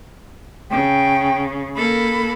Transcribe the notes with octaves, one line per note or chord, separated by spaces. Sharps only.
C#3 G5
A#3 A4 B5